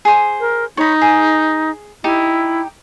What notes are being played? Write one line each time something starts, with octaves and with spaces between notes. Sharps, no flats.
G#4 C5
A#4
D#4 C#5 B5
G#4
D#4 E4 G4